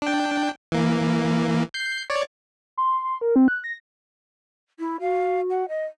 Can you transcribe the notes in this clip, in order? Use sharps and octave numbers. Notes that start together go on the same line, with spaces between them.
D4 G5
E3 A#3
G6 C7
C#5 D5
C6
C6
A#4
C4
F#6
A#6
E4
F#4 F5
F#5
D#5